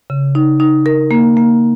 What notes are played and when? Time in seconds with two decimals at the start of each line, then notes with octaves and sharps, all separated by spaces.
0.10 C#3
0.35 D#4
0.60 D#4
0.86 A#4
1.11 A#3
1.37 A#3